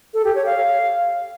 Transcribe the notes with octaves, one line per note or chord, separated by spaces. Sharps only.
A4
G4
C#5
F5